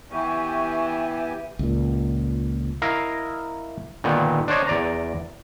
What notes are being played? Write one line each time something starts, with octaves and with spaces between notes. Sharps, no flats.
E3 B3 G4 E5 G#5 C#6
C#2 A#2
E4 A#4 D#5 F5
A#2 D3 D#3 B3
D4 C5 C#5 D#5
E2 D5 A#5